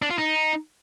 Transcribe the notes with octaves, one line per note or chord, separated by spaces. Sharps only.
D4
F4
D#4